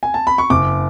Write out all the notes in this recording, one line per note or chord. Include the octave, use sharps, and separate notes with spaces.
G#5
A5
B5
C#6
F#1 D6